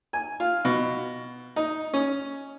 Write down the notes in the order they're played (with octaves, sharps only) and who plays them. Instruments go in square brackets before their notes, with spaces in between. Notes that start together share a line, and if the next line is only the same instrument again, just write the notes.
[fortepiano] G#5
F4
B2
D#4
C#4